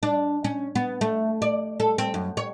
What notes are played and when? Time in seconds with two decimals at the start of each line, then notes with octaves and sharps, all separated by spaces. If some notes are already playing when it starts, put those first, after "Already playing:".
0.03 D4
0.44 C#4
0.75 B3
1.01 A3
1.42 D5
1.80 A4
1.98 C4
2.14 F#2
2.37 C#5